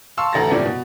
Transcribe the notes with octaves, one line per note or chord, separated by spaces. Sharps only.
F5 A5 C6 C#6 E6
A1 D2 A4 A#5 A6 A#6
G1 A2 C3 F3 D5
B2